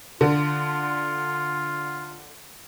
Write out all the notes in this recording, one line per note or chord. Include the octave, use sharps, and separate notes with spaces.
D3 F4